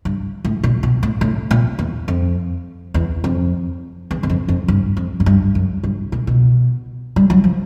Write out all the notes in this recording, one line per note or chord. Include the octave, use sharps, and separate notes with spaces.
G2
A2
A#2
B2
A2
A2
A#2
E2
F2
E2
F2
E2
E2
F2
F2
G2
F2
G#2
G2
F#2
G2
A#2
B2
G3
F#3
F3